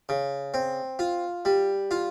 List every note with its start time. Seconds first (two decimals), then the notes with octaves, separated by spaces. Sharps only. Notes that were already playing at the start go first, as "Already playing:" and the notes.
0.09 C#3
0.54 C4
0.99 F4
1.45 G3
1.91 F4